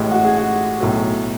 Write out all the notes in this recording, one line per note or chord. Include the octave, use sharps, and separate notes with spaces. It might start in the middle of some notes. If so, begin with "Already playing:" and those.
Already playing: A1 A2 G#3
F#4
G#4
F#4
B1 A2 F#3